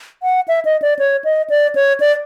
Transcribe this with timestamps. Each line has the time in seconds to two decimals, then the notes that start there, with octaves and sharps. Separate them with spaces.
0.23 F#5
0.48 E5
0.65 D#5
0.82 D5
0.99 C#5
1.25 D#5
1.50 D5
1.75 C#5
2.00 D5